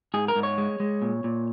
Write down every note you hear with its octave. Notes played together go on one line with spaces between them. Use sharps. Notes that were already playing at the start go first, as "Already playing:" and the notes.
G#2 G#4
A#4
G#2
C#5
G#3
G#3
A#2
A#2